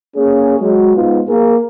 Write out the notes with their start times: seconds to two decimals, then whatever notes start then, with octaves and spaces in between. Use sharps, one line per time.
0.15 A#3 C#4 G#4
0.60 F#3 G#3
0.96 G#2 B3 D#4 F4
1.28 A#3 G#4 A#4